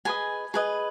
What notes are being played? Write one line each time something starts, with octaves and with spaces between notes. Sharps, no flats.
G#4 B4 D#5 G#5
G#4 B4 D#5